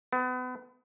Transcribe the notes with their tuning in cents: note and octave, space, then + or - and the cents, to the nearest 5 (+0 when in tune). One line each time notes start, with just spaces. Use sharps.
B3 +35